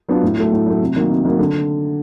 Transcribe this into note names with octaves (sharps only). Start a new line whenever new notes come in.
F#3 B3 D4 F4
A2
F#3 A3
A2
F#3 A3
C3
D#3 F#3 A#3
C3
D#3 F#3 A#3
D3